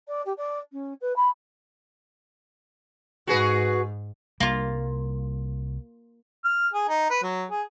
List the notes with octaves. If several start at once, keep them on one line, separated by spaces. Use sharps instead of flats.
D5
G4
D5
C#4
B4
B5
G#2 F#4 G#4 B4
C2 G3 A#3 F4
F6
G#4
D#4
B4
F#3
G#4